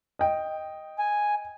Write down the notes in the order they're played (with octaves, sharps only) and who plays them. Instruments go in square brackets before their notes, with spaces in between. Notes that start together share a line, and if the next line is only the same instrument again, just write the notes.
[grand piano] D#5 G5
[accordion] G#5